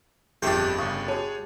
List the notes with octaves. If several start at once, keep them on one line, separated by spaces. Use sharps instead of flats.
G1 F2 D4 G4 G#4 E5 G5
G1 C#3 F5 C#6 D#6
F#4 G#4 C#5 A5